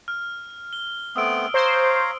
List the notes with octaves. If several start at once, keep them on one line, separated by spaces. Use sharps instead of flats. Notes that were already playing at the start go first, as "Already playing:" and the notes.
F6
G7
A3 B3 C4 D#6 E6 D7
C5 C#5 F5 A#5 C6